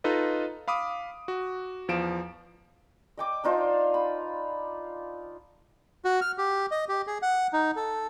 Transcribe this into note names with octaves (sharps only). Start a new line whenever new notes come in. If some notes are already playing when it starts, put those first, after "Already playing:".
D#4 F4 A4 B4 D#5
F5 B5 D6 D#6
F#4
E2 F3 F5 D7 E7
D#5 G5 D6
D4 D#4 F4 C5
B5
F#4
F6
G4
D#5
G4
G#4
F#5
D#4
A4